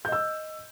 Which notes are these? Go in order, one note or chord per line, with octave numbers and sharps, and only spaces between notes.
D#5 E6 G6